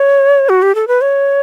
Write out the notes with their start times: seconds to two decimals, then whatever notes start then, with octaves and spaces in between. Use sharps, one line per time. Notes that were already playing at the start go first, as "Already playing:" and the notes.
Already playing: C#5
0.49 F#4
0.62 G4
0.75 A4
0.88 B4
1.01 C#5